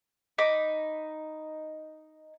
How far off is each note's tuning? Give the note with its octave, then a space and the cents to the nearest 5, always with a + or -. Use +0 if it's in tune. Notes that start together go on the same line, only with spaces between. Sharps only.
D#4 +0 B5 +0 D6 +0